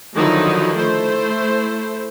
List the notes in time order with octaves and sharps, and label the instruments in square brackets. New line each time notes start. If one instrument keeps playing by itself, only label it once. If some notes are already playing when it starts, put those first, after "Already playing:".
[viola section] D3 D#3 F3 F#3 D#4 E4
A3 E4 C5